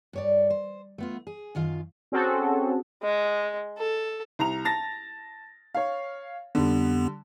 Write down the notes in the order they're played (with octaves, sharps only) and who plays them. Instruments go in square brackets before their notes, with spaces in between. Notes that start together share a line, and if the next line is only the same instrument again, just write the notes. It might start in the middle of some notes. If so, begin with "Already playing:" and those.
[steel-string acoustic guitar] G2 C#5 D5
C5
A3 B3 F4
G#4
F#2 D#3 F4 F5
[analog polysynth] C4 C#4 F#4 G#4 A4
[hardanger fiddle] G#3
A4
[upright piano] C2 A#5 F7
A5 A6 A#6
C#5 F5
[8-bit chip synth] F2 B3 [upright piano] D3 G3